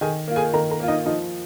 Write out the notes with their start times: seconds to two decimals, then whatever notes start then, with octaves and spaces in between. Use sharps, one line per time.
0.01 D#3 G#4 G#5
0.28 A#3 F4
0.36 G#4 G#5
0.53 D#3 A#4 A#5
0.71 A#4 A#5
0.80 A#3 F4
0.88 D#4 D#5
1.05 F3 D#4 D#5